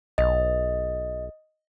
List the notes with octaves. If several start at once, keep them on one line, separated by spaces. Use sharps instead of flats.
B1 D#5